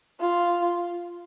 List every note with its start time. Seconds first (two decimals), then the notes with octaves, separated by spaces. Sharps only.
0.20 F4